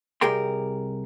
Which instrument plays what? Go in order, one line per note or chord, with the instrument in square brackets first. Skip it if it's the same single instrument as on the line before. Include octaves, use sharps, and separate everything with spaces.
[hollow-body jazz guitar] C2 G4 G#4 A#4 G5 C6